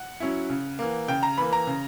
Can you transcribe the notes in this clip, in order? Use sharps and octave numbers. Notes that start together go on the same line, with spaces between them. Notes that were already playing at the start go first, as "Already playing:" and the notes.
Already playing: F#5
F#3 C#4 E4
C#3
E3 A#3
C#3 G5
A#5
E3 A#3 B5
A#5
C#3